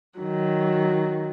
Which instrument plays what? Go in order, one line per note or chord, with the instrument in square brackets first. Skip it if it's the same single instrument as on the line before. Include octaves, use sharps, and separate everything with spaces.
[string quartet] D#3 F#3